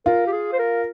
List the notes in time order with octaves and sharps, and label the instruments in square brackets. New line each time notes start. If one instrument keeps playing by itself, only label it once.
[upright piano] F4 [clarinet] A#4
[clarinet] G4
G#4
C5
A#4